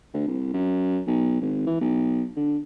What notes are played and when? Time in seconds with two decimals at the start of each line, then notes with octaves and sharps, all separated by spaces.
0.13 D2
0.27 C2
0.53 F#2
1.07 B1
1.41 G#1
1.67 E3
1.81 B1
2.37 D3